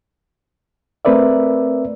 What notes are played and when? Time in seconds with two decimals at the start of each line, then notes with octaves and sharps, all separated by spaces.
1.05 A3 C4 A#4 B4 D5 E5